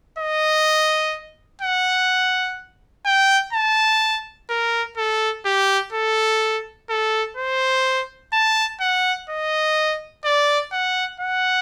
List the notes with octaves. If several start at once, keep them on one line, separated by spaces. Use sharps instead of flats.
D#5
F#5
G5
A5
A#4
A4
G4
A4
A4
C5
A5
F#5
D#5
D5
F#5
F#5